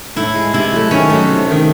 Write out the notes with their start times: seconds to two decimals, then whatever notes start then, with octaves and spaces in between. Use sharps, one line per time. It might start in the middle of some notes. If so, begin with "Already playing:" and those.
0.16 A2 E4
0.35 G#3
0.53 C3 E4
0.72 F#3 A3
0.91 D#3 C#4
1.10 F#3 A3
1.29 C3
1.47 D#3 A3